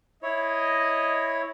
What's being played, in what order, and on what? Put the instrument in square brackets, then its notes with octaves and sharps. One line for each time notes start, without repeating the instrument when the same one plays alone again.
[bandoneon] E4 C#5 [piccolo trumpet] D#5